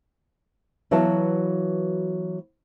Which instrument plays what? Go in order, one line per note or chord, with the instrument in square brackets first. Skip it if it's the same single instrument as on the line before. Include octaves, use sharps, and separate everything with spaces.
[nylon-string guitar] E3 F#3 B3 F#4 F5 A5